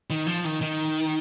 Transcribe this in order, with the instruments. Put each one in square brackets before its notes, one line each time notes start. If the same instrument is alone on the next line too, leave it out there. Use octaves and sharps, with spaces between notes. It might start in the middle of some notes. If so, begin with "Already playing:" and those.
[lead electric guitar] D#3
F3
D#3
D#3